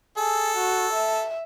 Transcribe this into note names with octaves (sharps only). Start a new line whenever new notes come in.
G#4 A4
F#4
E5